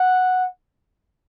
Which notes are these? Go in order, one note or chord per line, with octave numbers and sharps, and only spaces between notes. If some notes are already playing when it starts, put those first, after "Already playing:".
Already playing: F#5